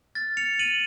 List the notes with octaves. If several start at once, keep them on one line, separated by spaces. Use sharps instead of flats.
F6 A6
F6 C#7 F7
F6 D#7 F#7